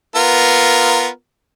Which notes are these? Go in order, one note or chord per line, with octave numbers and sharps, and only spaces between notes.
B3 F4 A#4